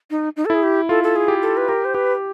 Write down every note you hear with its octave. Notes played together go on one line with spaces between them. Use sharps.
D#4
D#4
A4
E4 G#4
G4
F4 A4
A4
G#4
G4
A4
B4
G4 A#4
C5
G4 B4